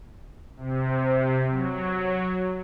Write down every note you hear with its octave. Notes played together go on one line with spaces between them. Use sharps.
C3
F#3